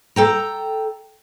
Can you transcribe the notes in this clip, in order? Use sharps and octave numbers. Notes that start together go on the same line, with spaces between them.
A4 G5 A#5